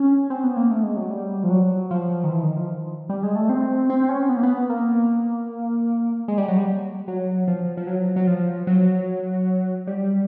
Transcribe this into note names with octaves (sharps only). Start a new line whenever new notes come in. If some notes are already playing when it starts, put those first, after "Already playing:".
Already playing: C#4
C4
B3
A#3
A3
G#3
F#3
G3
F3
F#3
F3
D#3
E3
D#3
F3
G3
G#3
A3
C4
C4
C#4
B3
A#3
B3
A#3
G#3
G3
F#3
G3
F#3
F3
F3
F#3
F#3
F3
F#3
G3